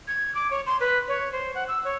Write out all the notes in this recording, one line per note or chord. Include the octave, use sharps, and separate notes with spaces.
G#6
D6
C#5
C6
B4
C#5
C5
F#5
E6
C#5